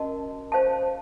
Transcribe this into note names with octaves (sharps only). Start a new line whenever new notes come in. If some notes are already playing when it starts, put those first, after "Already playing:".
Already playing: C#4 F#4 A#4 D#5 A5
C5 F5 A5